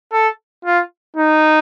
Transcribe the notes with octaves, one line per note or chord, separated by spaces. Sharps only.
A4
F4
D#4